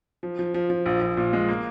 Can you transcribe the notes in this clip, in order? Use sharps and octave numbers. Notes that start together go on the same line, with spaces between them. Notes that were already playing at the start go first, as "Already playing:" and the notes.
F3
F3
F3
F3
A#1
A#1
A#2
G#3
A#3